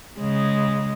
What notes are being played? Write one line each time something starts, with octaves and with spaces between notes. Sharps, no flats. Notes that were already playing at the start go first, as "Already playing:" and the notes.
C#3 G#3